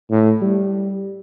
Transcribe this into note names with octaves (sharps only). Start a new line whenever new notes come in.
A2
G3